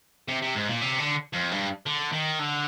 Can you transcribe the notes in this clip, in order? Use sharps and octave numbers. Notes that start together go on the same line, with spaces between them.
C3
C3
G#2
A#2
C3
D3
F2
G2
D3
D#3
D3